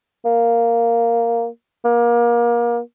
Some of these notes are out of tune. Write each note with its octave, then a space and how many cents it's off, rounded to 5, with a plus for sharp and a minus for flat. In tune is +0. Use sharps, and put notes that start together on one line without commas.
A#3 -5
A#3 +30